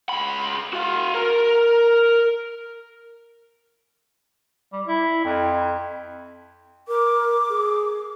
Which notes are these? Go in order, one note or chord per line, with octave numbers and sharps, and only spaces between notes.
C#2 B5
F#4 F5
A#4 A#5
G3
E4
F2
A#4 D6
G#4